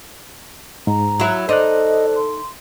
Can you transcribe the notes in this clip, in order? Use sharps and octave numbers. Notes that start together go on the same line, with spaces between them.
G#2 A#5
F#3 E4
D#4 A4 C5 D5 D#5 F#6
C6